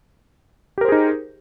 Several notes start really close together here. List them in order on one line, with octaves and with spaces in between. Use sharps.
G4 A#4 C5 G#4 D#4